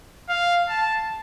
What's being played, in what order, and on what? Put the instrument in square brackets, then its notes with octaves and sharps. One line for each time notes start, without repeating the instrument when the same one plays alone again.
[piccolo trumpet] F5
A5